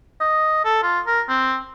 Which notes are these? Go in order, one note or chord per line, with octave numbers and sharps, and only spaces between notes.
D#5
A4
F4
A#4
C4